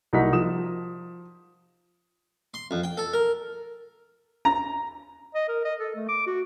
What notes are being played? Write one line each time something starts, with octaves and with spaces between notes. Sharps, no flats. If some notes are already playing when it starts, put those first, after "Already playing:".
C2 A#3 D#4 F#4 B6
F3 D#6 E7
C6
F2
G5
A4
A#4
A#5
D#5
A#4
D#5
A4
A3
D6
F#4